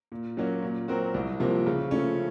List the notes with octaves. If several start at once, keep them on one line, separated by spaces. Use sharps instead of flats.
A#2
F#3 A#3 C#4 F#4
A#2
F#3 C4 F#4 A#4
C2
C3 F3 A#3
C#3
F3 A3 C#4